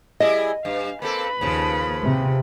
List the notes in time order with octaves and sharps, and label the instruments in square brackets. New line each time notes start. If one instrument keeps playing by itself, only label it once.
[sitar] G3 E4 G#4 [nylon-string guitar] D#5
[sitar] G2 [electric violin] F5
[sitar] A#3 C4 A4 [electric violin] B4 B5
[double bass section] D#2 [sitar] C#3 F3
[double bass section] C3